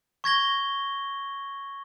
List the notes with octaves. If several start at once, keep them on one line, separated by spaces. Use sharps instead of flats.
C#6 G#6 A#6 G7